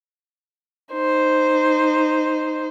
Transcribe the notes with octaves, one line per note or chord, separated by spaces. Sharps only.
D#4 C5